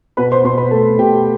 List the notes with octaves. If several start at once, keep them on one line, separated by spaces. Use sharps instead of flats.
B2 B4 B5
C5 C6
B2 C5 C6
B4 B5
A3 A4 A5
B2 G4 G5